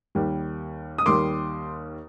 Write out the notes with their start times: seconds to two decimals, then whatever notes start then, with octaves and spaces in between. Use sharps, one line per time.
0.15 D#2 D#3 G3
0.98 D#6
1.06 D#2 D#3 G3 C6 D6